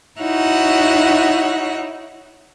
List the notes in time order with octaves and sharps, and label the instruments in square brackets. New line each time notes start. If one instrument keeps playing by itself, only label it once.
[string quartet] D#4 E4 F#4 C#5 F#5